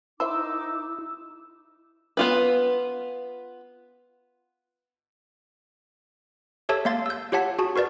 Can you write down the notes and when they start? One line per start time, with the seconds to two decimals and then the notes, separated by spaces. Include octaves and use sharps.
0.20 D#3 D#4 E4 C5 E5 D6 E6
2.17 B3 F4 B4
6.69 G4 A4 C#5 E5 A5 E6
6.85 A3 A#3 F5 C6 A6
7.06 E6 G6
7.32 F4 G4 C#5 F#5 A5 B6
7.59 F#4 G#4 A5
7.76 F#4 A#4 B4 D5